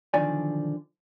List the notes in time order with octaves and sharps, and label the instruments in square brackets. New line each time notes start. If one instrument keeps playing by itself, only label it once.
[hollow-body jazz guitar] B1 D3 D#3 F3 D5 G#5